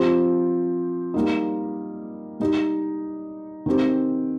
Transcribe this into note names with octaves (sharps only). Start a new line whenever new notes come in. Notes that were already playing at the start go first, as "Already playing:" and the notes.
Already playing: F3 C4 G4
G3 A#3 D#4
G3 D#4 G4
D#3 C4 G4